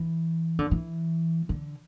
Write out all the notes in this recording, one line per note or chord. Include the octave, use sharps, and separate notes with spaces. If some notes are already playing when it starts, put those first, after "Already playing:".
Already playing: E3
D3
E3
D3